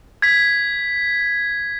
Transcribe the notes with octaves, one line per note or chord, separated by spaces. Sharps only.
G#6 B6